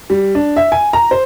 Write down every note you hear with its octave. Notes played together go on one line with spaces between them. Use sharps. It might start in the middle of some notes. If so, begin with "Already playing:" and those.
G3
D4
E5
G#5
A#5
C5